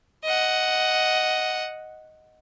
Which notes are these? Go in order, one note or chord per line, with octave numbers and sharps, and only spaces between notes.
D#5 F#5